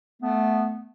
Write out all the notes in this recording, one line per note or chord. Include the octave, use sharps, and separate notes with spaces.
A3 B3